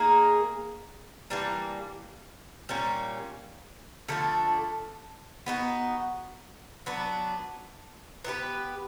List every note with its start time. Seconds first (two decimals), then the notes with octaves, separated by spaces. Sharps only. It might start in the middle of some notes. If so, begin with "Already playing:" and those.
Already playing: A#3 D#4 G#4
1.30 E3 G3 A#3 D4
2.69 A#2 G3 A#3 C#4
4.08 D3 F3 A3 D4
5.46 B3 D#4 F#4
6.86 F#3 B3 D4
8.25 B3 D#4 G4 B4